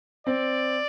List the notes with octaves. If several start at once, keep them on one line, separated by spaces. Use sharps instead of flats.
C4 D5